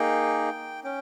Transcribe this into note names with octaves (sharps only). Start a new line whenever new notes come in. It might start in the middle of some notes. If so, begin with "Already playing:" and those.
Already playing: A#3 D#4 G#4 G5
C#4 G5